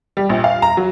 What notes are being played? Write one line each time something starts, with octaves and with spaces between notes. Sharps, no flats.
G3
A#1
F5
A#5
F#3